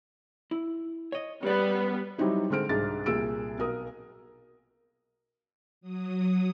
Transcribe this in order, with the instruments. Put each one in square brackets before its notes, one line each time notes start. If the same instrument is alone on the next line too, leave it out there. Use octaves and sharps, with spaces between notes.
[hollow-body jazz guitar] E4
C#5 D#5
[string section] G3 B3 [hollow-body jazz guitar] C#4 D5 [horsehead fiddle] B4
[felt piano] F#3 G3 C4 D#4 E4
D3 G#3 C4 F6 D7
C2 G#2 G#3 D4 A6
C2 A#2 G#4 E6 D7
B1 A#4 D#6
[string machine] F#3 D#6